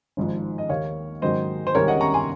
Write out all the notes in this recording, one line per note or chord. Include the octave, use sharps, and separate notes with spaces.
G#1 G#2 F3
D#5
D#2 D#3 A#3 C#5 F5
G#2 D#3 F#3 A#3 C5 D#5
C5
C2 C3 D#3 G#3 C#4 A#4 C#5
D#5 F#5
A#5 C#6
G#5 C6